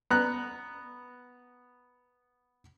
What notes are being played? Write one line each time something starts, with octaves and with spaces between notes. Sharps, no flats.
B3 A#5 F#6